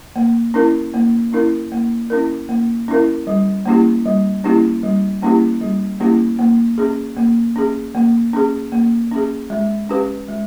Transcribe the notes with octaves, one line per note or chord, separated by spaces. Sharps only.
A#3
C#4 E4 A#4
A#3
C#4 E4 A#4
A#3
C#4 E4 A#4
A#3
C#4 E4 A#4
G3
A#3 C#4 E4 G4
G3
A#3 C#4 E4 G4
G3
A#3 C#4 E4 G4
G3
A#3 C#4 E4 G4
A#3
C#4 G#4
A#3
C#4 G#4
A#3
C#4 G#4
A#3
C#4 G#4
G#3
C#4 G4 B4
G#3